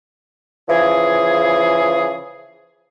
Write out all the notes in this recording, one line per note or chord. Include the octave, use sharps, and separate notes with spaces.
C#3 E3 F3 G#4